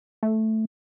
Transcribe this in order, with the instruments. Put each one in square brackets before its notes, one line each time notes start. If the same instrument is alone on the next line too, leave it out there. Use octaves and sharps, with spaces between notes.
[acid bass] A3